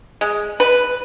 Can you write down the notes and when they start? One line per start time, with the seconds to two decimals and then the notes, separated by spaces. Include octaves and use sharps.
0.21 G#3
0.60 B4